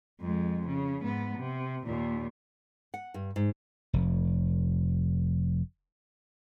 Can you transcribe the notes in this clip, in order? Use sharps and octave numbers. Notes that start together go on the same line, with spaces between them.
F2 G#3
C#3
G#2 B3
C3
D#2 A#2
F#5
G2
G#2
F1 F2